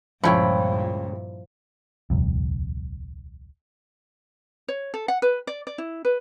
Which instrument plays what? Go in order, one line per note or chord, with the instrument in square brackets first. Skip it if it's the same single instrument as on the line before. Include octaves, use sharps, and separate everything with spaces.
[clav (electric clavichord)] C#2 C#5 [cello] G2 A#2 [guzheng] F3 E4 [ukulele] G5 B5
[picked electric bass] D#1 C2 F2
[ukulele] C#5
A4
F#5
B4
D5
D5
E4
B4